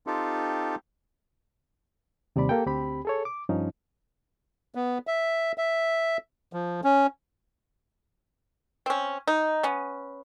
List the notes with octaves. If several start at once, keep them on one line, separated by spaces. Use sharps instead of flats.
C4 D#4 F4 G4 A4
D#2 C3 G3 D5 B5
A#3 G4 A4 G5
D2 C4 G4 B5
G#4 A4 C#5
D6
G2 F3 C#4 D#4
B3
E5
E5
F3
C#4
C4 C#4
D#4
B3 C#4